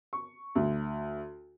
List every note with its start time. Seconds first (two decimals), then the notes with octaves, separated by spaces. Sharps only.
0.13 C#6
0.55 D2